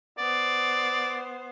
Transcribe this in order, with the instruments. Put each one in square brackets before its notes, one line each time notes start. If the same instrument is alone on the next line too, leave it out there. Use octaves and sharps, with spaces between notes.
[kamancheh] B3 C5 [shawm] D5